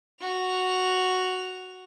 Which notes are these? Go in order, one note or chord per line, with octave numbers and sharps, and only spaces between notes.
F#4 F7